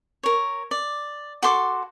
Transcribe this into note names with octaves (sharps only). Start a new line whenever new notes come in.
A#4 C#5
D5
F#4 A4 C6 D6